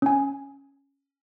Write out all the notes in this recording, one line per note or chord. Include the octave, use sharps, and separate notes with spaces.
C#4 G#5